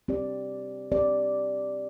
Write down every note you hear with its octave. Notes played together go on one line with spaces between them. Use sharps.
C4 G4 D5
C4 G4 D5